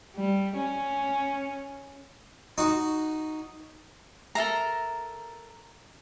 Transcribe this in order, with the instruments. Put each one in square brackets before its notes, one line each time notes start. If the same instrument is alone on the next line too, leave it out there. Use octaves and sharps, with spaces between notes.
[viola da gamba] G3
C#4
[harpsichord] D#4 F#4
[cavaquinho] A4 A#4 E5 A#5